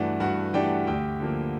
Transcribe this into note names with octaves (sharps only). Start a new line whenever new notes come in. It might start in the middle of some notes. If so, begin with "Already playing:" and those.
Already playing: G2 E3 A3 D4 F#4 F#5
G2 F#4 F#5
E3 A3 D4 G4 G5
D2 G4 G5
D3 F3 A#3